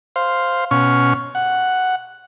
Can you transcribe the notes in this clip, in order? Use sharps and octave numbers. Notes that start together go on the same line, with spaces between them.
C5 F5
B2 C#4 C#6 F6
F#5